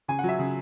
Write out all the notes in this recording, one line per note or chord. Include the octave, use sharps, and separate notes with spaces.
C#3 G#5
F#5
F#3
E5
C#3